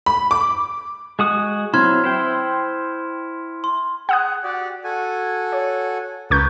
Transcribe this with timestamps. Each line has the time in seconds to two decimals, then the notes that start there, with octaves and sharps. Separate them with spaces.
0.06 B5
0.31 D6
1.19 G#3 F#4 D#6
1.74 F#3 C4 E4 C6 F6 G#6
2.04 E4 C5 G5
3.64 C6
4.09 G#4 F#5 D#6 F#6
4.43 F#4 G4 D5
4.84 F#4 A4 G#5
5.52 C#5
6.30 C#2 A#4 B4 C#6 G6